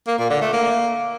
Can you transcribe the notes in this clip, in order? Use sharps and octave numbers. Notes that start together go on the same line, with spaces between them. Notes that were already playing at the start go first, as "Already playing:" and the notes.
A#3
A#2
D3
A3
A#3